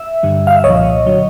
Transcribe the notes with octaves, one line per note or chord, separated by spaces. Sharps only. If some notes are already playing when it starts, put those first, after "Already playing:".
Already playing: E5
G2 D3 G3
F5
E5
C2 A#2 F3 C#5 D#5
D3 F#3